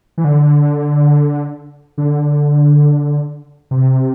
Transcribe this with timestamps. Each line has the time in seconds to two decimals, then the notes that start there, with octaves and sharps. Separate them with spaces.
0.18 E3
0.24 D3
1.98 D3
3.71 C3